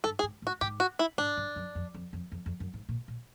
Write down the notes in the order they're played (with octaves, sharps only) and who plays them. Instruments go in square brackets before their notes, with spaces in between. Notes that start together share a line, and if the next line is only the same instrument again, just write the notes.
[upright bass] G2 [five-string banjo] A4
[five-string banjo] G#4
[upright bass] G#2
A2
[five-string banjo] F#4
[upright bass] G#2 [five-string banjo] G4
[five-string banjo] F#4
E4
[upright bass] G#2 [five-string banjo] D4
[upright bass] G2
F#2
F2
F2
F2
F2
F2
F#2
G#2
A#2
A#2